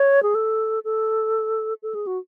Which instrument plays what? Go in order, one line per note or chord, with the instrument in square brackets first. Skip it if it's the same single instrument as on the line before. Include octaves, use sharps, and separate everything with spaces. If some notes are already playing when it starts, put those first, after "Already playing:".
Already playing: [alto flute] C#5
G#4
A4
A4
A4
G#4
F#4